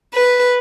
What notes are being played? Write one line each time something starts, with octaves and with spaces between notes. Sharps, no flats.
B4